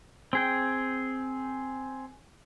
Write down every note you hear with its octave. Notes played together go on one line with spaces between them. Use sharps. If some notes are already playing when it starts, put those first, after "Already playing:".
C4 G#4 G5